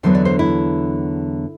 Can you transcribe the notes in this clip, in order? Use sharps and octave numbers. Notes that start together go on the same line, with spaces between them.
E2 D3 F#3 B3 C5
D5
C5
E4